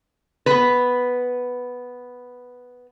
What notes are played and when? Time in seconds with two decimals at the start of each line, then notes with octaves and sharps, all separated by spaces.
0.46 B3 B4